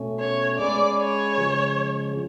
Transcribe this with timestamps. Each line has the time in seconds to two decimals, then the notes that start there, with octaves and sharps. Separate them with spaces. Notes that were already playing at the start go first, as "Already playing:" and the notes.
Already playing: B2 A3 C#4
0.19 C#5
0.58 G#3 C#4 G#4 B4 D5
0.98 C#5
1.38 C#3 F3 G#3